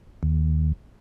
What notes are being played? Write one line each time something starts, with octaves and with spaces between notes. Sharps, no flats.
D#2